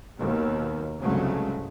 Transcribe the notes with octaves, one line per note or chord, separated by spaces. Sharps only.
D#2 B2
C2 G2 C#3 F#3 G#3 A3